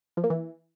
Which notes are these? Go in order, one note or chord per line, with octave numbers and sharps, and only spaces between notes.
F3
A#3
E3